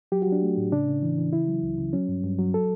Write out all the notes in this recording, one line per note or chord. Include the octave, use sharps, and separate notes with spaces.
F#3 G4
F#4
F#3
D4
A3
A2
C#3 D4
C#3
E3
E3
C#3 E4
F#3
C#2
C#3
F#3 C#4
G2
G2
F#3
A4